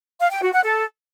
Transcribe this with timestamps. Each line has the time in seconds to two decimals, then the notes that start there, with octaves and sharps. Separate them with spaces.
0.20 F5
0.31 G5
0.42 F#4
0.53 F#5
0.64 A4